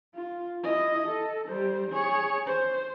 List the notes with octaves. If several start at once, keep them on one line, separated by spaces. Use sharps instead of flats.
F4
E4 D#5
A4
G3 C5
G#4 C#5
C5